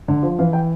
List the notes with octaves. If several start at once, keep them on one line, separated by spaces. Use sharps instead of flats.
D3
F3
E3 F5
G5